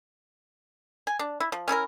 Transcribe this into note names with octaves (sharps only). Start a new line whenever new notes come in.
G#5
D4
E4
F3
C#4 E4 A4 A#4